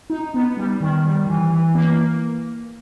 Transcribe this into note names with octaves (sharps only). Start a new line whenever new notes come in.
D#4
B3
G3
D#3
G3
E3
E3
A#3